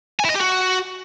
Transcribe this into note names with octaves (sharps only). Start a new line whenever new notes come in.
G#5
E4
D#5
G4
F#4